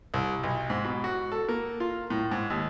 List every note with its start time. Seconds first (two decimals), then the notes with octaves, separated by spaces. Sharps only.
0.14 C2
0.43 B1
0.70 G#2
0.85 B2
1.04 F#4
1.32 A4
1.49 A#3
1.80 F4
2.10 A2
2.31 G#2
2.50 D#2